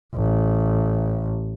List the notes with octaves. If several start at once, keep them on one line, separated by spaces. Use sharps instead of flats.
A1